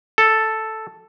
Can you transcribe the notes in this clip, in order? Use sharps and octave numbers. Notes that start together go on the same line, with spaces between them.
A4